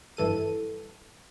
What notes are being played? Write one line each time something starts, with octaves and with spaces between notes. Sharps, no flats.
G1 G2 E3 A4 D#7